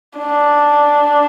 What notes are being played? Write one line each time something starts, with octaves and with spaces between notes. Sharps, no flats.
D4